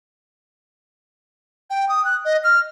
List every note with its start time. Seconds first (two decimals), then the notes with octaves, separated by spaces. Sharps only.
1.70 G5
1.89 D#6
2.05 F#6
2.25 D#5
2.44 F6